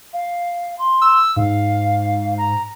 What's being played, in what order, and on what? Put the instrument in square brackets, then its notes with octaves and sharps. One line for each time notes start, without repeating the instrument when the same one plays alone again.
[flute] F5
C6
[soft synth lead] E6
[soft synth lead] G#2 [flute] F5
[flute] A#5